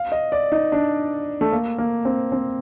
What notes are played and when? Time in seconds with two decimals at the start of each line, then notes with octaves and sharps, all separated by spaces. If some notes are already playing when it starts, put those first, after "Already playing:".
Already playing: F5
0.12 D#5
0.32 D5
0.52 D#4
0.72 D4
1.41 A3
1.52 A#3
1.78 A#3
2.05 C4
2.32 C4